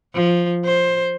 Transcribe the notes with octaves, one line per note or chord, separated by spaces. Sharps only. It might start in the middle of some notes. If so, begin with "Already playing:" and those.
F3
C5